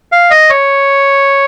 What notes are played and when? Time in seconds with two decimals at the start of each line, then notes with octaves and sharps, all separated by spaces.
0.12 F5
0.31 D#5
0.50 C#5